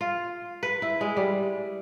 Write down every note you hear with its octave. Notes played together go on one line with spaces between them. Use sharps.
F4
B4
E4
G#3
G3